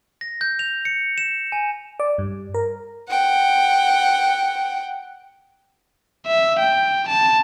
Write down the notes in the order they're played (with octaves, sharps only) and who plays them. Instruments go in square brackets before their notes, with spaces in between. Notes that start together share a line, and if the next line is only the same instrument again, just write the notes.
[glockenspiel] A#6
G6
F7
C#7
E7
G#5
[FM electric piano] D5
G2
A#4
[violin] F#5 G5
[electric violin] E5
G5
A5